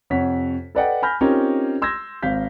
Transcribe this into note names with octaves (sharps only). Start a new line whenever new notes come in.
F2 C3 C#5 F#5 B6
A4 B4 D5 D#5 F#5 G5
G#5 B5 F6 G6 A#6
C4 C#4 D#4 F4 G4 A#4
C6 E6 G6 G#6 A#6
G#1 C4 F5 G6 B6